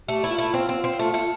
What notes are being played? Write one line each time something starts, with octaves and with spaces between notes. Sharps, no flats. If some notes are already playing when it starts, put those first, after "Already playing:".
A3 G4
E4
F4
A3
C4 F4
C4
C4
A3
A3